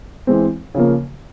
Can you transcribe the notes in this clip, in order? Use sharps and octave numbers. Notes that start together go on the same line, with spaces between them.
E3 G#3 C4
C#3 F3 A#3